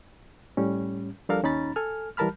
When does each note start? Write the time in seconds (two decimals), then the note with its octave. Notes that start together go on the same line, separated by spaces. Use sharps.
0.57 A2 G3 C#4
1.29 F3 G3 D4 A4 A#4 F5
1.43 D#2 C#4 D#4 A#5 B5 A6
1.76 A4 G#5 F6
2.17 E3 G3 A#4 A5 B5 F6